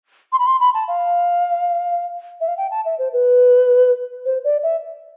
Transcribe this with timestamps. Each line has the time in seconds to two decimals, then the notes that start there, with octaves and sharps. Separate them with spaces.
0.33 C6
0.39 B5
0.47 C6
0.60 B5
0.74 A5
0.88 F5
2.41 E5
2.48 F5
2.57 G5
2.71 A5
2.85 E5
2.99 C5
3.13 B4
4.26 C5
4.44 D5
4.63 E5